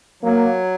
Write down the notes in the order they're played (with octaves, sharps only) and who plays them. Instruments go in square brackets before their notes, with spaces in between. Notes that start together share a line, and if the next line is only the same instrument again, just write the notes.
[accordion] F#3 [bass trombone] A#3